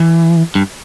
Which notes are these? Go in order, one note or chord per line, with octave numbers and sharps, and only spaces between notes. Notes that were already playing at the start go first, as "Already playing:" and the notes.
Already playing: E3
G2